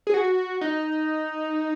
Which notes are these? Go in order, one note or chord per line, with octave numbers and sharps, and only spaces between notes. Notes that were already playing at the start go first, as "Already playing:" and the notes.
G#4
F#4
D#4